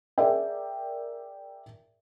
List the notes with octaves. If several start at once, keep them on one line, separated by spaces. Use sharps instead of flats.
G#4 A#4 D5 E5 G5